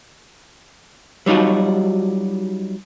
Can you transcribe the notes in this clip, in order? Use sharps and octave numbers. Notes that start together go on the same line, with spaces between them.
F#3 G3 D#4 F4 F#4